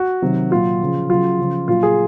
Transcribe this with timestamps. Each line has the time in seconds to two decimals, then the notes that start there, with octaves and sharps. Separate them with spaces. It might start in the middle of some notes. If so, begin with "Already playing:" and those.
Already playing: F#4
0.22 C3 D#3 F#3
0.51 A#2 F#3 F4
0.81 C#3 F3
1.10 C#3 F#3 F4
1.39 C#3 F3
1.68 A#2 F#3 F4
1.83 G#4